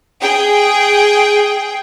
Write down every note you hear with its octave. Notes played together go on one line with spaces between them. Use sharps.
G#4 G5